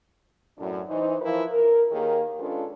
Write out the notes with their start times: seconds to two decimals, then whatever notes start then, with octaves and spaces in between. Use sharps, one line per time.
0.59 F#2 A2 D4
0.88 E3 D#4 C5
1.22 E3 F3 E4 F4 A#4 B4
1.51 A#4
1.91 D#3 A#3 G4 G#4 A#4 C#5
2.40 G#3 C#4 D4 F4 A4 B4